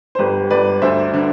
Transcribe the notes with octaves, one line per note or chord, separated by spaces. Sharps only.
C5
G1 G4 B4
G1 B4 D5
D2 C5 E5
D3